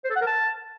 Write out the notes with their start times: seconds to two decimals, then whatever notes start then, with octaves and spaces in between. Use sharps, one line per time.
0.05 C5
0.10 A4
0.16 F#5
0.21 A#4
0.27 A5